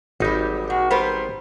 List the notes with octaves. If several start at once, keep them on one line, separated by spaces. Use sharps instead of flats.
G#1 F#3 G3 D#4
A#2 F#4
G3 B3 A#4 C5